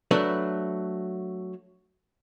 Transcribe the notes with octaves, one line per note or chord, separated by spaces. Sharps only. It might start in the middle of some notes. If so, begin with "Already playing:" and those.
F#3 A3 D4 B4